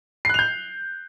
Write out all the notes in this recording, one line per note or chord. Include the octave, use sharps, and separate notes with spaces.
F#6 G6 C7 F7